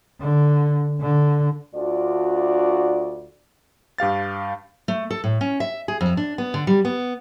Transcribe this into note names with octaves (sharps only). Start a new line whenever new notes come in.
D3
D3
D2 D4 F4 F#4 D5
G2 G4 F5 A6
A3
A4
A2
C#4
E5
G#4
F2
D4
B3
D3
G3
B3